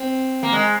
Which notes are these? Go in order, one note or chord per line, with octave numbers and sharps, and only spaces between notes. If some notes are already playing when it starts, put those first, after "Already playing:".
Already playing: C4
A#3
G#3